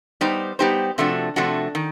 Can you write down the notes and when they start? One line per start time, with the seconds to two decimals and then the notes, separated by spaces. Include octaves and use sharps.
0.21 G3 B3 D#4 G4 C5
0.59 G3 B3 D#4 G4 C5
0.98 C3 F3 A3 D4 F#4
1.36 C3 F3 A3 D4 F#4
1.75 D#3